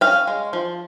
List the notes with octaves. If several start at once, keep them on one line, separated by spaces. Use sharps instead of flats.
C#4 F5 G5
G#3
F3